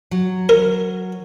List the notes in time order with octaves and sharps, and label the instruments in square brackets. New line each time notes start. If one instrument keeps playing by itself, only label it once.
[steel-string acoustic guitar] F#3
[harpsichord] A#4